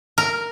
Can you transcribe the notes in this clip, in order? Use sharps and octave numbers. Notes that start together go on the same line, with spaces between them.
A#4